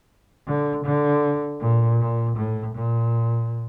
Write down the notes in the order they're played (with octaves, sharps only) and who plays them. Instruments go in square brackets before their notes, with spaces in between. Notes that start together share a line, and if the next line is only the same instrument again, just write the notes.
[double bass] D3
D3
A#2
A#2
A2
A#2